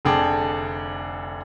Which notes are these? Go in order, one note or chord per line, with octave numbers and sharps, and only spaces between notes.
F1 D3 G#4 G5 A5 D6